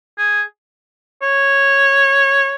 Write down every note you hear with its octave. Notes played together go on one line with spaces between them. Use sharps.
G#4
C#5